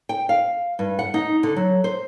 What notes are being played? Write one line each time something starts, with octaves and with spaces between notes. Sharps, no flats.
G5
F5
G2
F#5
D#4
D3
F#3
C5